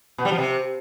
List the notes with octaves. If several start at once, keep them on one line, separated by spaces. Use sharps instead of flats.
B2
G3
F3
C3